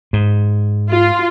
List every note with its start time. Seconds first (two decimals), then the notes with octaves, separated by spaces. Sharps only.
0.13 G#2
0.90 F4